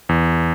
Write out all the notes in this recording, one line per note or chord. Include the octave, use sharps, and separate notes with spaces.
E2